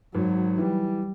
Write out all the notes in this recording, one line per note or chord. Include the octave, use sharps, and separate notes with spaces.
G#1 F#3
E3 G3